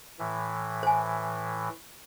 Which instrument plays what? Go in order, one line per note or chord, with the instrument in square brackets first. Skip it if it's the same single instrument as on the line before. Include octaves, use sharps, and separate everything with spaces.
[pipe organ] A2 E3
[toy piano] C5 G#5